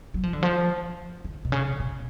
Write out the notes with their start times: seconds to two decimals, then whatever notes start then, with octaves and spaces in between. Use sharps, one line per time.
0.14 F#3
0.23 F3
0.33 D3
0.43 F3
1.24 D3
1.45 B2
1.52 C#3
1.80 B2